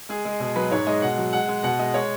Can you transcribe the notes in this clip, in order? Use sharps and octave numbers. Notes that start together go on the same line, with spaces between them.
G#3 G#4
G#3
B2 G#4
F#3 B4
G#2 C#5
G#3 D#5
B2 F#5
F#3
G#3 F#5
G#3
B2 F#5
G#3 D#5
G#3 C#5